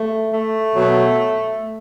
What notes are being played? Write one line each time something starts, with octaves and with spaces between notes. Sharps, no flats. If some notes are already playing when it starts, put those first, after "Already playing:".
Already playing: A3
A3
B2 F#3